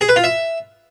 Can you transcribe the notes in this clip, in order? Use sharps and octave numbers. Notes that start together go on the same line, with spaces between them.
G#4
B4
F4
E5